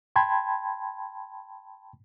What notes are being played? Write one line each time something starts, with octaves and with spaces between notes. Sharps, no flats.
G5 A5 B5 C6 G#6